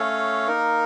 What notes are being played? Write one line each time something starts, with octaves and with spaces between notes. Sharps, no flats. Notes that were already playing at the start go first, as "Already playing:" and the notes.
Already playing: A3 C#4 A4 C#5 F5
A#3 D#4 A#4